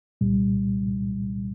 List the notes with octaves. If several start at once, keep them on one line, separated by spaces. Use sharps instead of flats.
C2 A#2 G3